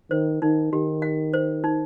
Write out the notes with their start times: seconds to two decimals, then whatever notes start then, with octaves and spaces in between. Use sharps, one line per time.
0.11 D#3 C5
0.42 D#3 D#4
0.73 D#3 G4
1.02 F#5
1.34 C5
1.64 D#4